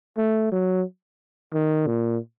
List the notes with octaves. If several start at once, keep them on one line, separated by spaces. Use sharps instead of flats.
A3
F#3
D#3
A#2